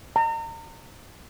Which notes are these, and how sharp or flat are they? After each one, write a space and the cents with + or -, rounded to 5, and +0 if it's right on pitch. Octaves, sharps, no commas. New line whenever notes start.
A#5 -35